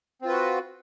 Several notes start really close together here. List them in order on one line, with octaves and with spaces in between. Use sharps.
C4 F4 B4 F#4